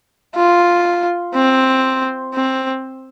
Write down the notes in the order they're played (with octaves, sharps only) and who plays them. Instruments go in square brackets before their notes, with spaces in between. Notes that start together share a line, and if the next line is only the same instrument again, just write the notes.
[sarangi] F4
C4
C4